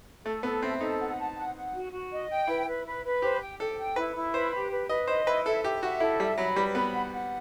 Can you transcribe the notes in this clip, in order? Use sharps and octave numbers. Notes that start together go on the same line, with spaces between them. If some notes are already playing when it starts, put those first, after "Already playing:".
A3 A4
B3 A4
C4 E5
D#4 A4
F#5
A5
F#5
F#5
F#4
F#4
D#5
G5
E4 B4
B4
B4
B4
G4 C5
G5
A4 G5
G5
E4 B4
E4
B4 C5
G4
B4
B4 D#5
C5 D#5
E4 B4
A4 E5
G4 E5
F#4 E5
E4 A4
G3 E5
F#3 B5
G3 B4
B3 B5
F#5
F#5